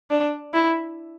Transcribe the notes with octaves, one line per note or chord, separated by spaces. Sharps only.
D4
E4